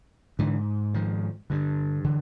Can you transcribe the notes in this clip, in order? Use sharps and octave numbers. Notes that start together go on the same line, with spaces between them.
G#2 D3 E3
D#3 F3
G2 D3
D3 E3